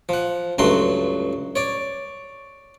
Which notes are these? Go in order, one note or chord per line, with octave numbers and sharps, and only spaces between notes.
F3 F#5
C#2 G2 F#3 A3 F#4 C6
C#5 D5